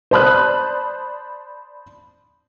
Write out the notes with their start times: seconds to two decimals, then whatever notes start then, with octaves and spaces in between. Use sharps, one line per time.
0.11 C5 D5 A5 B5 D#6 F#6